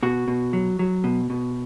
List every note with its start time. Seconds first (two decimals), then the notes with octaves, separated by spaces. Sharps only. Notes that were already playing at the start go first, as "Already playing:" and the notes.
0.03 B2 F#4
0.28 B2
0.53 F#3
0.79 F#3
1.04 B2
1.30 B2